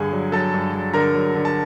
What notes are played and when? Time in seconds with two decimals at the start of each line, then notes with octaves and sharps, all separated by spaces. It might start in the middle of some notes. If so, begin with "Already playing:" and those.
Already playing: G2 D3 G#4 G#5
0.13 F#3
0.32 F#3 A4 A5
0.54 G2
0.74 F#3
0.94 D3 A#4 A#5
1.15 F#3
1.35 D3
1.45 A5